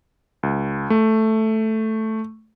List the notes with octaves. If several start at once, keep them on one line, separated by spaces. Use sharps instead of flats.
C#2
A3